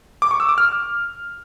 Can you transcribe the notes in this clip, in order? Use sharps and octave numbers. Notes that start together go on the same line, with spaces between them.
D6
C#6
E6
D6
F6